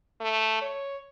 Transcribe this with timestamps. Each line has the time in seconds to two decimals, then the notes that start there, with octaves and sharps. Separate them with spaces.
0.21 A3
0.62 C#5